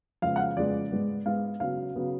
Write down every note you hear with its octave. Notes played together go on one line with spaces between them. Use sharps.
F2 C#3 G#3 B3 F5
F#5
F5
F2 C#3 G#3 B3 D5
G#2 G#3 B3
G#2 G#3 B3 F5
C#3 F#3 B3 F5
C#3 F#3 B3